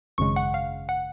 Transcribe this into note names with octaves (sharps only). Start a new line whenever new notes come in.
G#1 F#2 C#3 G#3 C#6
F#5
F5
F#5